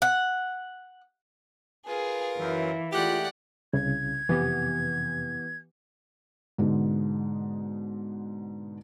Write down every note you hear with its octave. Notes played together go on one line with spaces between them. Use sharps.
F#5
F4 G#4 A#4 B4
F#2 E3
G#3 A3 F4 G4 D5 F#5
C2 C#3 G#6
F2 C3 E3 B3 G4
G#2 B2 D3 G#3 B3 D#4